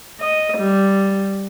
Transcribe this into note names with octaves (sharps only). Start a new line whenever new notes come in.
D#5
G3